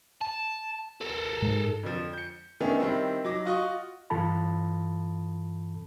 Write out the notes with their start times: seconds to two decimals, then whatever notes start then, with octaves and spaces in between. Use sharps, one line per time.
0.21 A5
1.01 A4 A#4
1.42 G#2
1.83 F2 D3 F3
2.13 G6 C#7
2.60 D#3 A3 B3 C#4 D4
2.79 D#3 G3 C4 E4
3.24 F#3 D#4 D6 A#6
3.45 F4 F#4 D#5 C#6
4.10 G2 E3 F4 A4 A5 B5